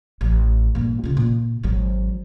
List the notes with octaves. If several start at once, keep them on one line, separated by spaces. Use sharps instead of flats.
A1
G2 A#2
C#3 F4
A#2
G#1 F#3